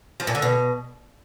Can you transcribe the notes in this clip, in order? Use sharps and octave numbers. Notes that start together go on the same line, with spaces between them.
F3
A#2
D3
B2